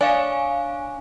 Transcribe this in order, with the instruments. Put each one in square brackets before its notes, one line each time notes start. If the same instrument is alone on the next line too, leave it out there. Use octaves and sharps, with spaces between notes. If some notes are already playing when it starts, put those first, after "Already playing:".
[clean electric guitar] D4 C#5 [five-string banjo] D5 [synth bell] F5 G#5